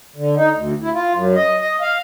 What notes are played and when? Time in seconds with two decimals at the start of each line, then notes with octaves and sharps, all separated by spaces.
0.16 D3
0.36 D#4
0.55 D2
0.82 E4
0.94 F4
1.14 F#2
1.36 D#5
1.60 D#5
1.81 F5